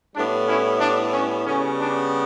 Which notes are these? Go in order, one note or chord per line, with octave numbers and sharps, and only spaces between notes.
A2 G3 B3 D4
C#4 E4
D4
C#4
C#3 G3 B3 C#4
D4